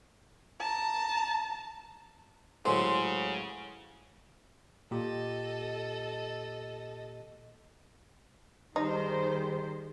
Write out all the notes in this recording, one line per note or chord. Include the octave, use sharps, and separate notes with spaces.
A5 A#5
A1 C#3 F#3 G#3 C5
A#2 G4 A4 D#5
D#3 G3 D#4 G#4 C5